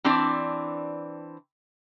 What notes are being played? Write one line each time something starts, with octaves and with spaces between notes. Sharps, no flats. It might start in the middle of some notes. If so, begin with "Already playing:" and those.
E3 C4 D4 D5